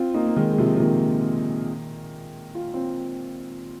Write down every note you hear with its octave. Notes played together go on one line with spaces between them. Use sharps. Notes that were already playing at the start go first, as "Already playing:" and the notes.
Already playing: C4 F4
A#3 D#4
A#3
D#3 G#3
G#3
C3 F3
F3
A#2 D#3
F4
C4 F4